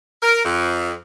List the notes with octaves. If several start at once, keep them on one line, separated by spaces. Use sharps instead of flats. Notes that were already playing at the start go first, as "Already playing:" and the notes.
A#4
F2